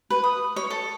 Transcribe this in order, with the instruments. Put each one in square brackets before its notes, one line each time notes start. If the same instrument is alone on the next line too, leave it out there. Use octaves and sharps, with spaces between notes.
[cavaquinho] B4
D#6
C#5
A4